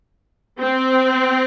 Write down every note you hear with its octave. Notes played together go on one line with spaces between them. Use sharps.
C4